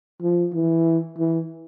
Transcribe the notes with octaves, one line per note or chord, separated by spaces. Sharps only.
F3
E3
E3